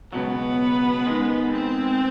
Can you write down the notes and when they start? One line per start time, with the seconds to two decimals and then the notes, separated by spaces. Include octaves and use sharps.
0.12 C#2 B2 F#3 B3
1.06 G#2 D#3 G#3
1.52 C4